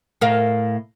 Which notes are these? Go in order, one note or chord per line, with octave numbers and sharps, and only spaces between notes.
A2 A#4 F5